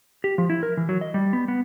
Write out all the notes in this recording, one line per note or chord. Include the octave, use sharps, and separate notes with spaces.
G4
F3
E4
A#4
E3
F#3
D#5
G3
B3
B3